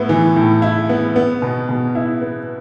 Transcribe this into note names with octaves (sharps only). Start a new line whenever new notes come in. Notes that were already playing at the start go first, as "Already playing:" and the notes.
Already playing: A2 B3 E4
E3
A2
E4
B3
B3
B2
B2
E4
B3